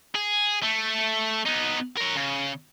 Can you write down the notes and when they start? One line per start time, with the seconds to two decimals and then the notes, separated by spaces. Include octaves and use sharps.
0.15 G#4
0.63 A3
1.46 B3 D#4
1.97 A#4 C#5
2.16 C#3